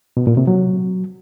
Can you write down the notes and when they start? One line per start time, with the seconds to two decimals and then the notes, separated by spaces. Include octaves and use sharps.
0.17 B2
0.27 A#2
0.37 C3
0.47 F#3